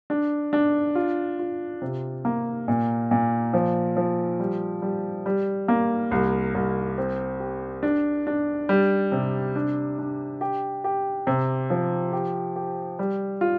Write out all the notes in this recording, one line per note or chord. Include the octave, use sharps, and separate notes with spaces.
D4
D4
F4
F4
C3
A#3
A#2
A#2
F3
F3
G3
G3
G3
A#3
C2
C2
C4
G4
D4
D4
G3
C3
D4
D4
G4
G4
C3
F3
G4
G4
G3
F4